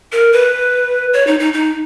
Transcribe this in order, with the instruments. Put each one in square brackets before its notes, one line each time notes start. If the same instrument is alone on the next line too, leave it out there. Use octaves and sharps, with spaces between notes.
[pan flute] A#4
B4
C#5
D#4
D#4
D#4